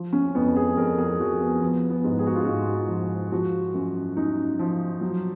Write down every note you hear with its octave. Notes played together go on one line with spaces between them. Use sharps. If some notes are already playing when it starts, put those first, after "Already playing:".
Already playing: F3
C#4
F2 B3
G#4
F2 A#4
G#4
F3 F#4
B3
F3 B3
B3
G#2
G#4
F#4
F4
G#2 F#4
F3
F3 F#4
F#2
F#2 D#4
F3
F#3